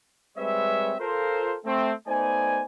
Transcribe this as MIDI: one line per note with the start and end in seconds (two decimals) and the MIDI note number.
0.38 0.95 55
0.38 0.95 56
0.38 0.95 60
0.38 0.95 71
0.38 0.95 73
0.38 0.95 76
1.00 1.55 65
1.00 1.55 69
1.00 1.55 70
1.00 1.55 72
1.65 1.92 57
1.65 1.92 60
2.07 2.64 57
2.07 2.64 59
2.07 2.64 63
2.07 2.64 72
2.07 2.64 74
2.07 2.64 80